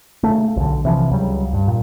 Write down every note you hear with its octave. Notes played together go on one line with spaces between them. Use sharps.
C#3 A3
B1 D3
C3 E3 F3
C#2 C#3 F#3 G3
G2
A#2